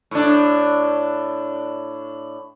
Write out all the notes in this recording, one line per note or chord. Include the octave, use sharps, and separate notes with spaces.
A2 D4